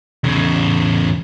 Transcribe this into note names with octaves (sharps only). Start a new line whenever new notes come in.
E2 C#3